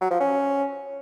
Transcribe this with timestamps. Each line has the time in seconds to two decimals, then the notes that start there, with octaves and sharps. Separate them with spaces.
0.01 F#3
0.11 F3
0.20 C#4